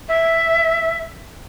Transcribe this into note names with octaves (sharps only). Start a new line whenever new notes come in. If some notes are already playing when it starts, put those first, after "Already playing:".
E5